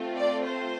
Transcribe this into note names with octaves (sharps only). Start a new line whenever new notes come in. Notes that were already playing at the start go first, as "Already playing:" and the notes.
Already playing: A3 C4 F4
D5
C5